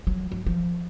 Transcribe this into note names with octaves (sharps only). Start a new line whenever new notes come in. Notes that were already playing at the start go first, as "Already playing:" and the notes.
F#3
F#3
F3